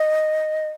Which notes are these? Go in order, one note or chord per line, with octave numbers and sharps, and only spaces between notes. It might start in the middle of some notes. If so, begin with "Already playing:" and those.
Already playing: D#5